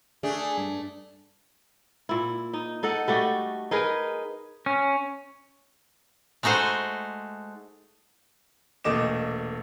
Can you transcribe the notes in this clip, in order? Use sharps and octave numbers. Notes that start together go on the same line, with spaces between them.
A3 D4 G#4
G2
A#2 E4
D#4
D#4 A4 D#5 F#5
G3 A3 F#4 G4
D#4 G#4 A#4 B4
C#4
G#3 A3 D#4 F#4 C5
E1 A#2 A3 D#5 D6 E7